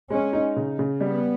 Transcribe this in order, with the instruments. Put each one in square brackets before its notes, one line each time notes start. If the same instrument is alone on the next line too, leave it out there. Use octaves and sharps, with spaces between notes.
[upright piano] G#3 [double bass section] C#4
[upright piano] D#4
C#3
C#3
[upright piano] G3 [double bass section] B3